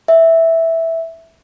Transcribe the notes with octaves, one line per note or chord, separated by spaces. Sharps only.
E5